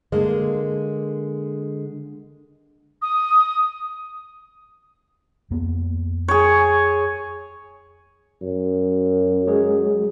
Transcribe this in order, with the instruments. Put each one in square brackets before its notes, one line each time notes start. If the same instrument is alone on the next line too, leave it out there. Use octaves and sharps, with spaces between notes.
[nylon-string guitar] D3 G#3 A#3
[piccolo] D#6
[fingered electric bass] F2 A#3 B3
[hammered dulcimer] G#4 C#5
[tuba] F#2
[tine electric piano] F#3 G#3 G#4